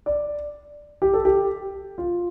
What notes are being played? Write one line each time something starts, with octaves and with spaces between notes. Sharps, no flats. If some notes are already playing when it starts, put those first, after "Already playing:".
D5
G4
A4
G4
F4